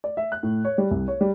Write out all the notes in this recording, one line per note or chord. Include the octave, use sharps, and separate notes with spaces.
D5
E5
F#6
A2
C#5
G3
C2
C#5
G3